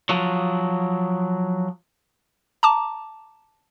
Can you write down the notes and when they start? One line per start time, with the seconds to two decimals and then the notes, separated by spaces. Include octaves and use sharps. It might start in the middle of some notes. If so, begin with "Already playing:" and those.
0.09 F3 F#3
2.63 A5 A#5 D6